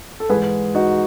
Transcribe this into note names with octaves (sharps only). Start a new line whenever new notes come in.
A4
G#2 E3 G#4 B4
D#4 F#4